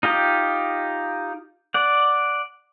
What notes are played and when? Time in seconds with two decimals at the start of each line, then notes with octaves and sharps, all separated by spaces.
0.03 D#4 F4 G4 D#5
1.74 D5 F#5